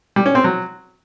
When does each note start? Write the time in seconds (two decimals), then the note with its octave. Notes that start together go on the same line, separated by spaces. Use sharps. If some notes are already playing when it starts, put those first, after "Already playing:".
0.16 G3
0.26 C#4
0.35 C4
0.44 F#3